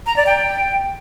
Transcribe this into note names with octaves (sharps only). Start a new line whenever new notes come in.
A#5
D5
G5